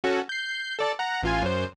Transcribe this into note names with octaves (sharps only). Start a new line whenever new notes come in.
C#4 F#4 A4
G6 C7
A4 D5 A5
F#5 A#5
A1 F4 G#5
F#2 C5